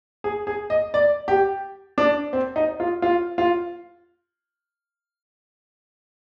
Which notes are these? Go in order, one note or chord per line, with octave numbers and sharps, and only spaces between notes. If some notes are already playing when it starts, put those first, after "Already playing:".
G#4
G#4
D#5
D5
G4
D4
C4
D#4
F4
F4
F4